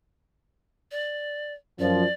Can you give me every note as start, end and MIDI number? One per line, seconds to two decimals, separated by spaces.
0.91 1.53 74
1.79 2.04 42
1.79 2.04 53
1.79 2.13 74